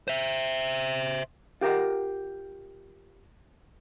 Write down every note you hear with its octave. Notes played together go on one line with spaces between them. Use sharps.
C5 E5
F4 G4 A#4 F5 F#5